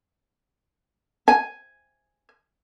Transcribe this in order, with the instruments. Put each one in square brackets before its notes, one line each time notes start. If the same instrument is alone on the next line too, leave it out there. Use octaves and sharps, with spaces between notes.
[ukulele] G#5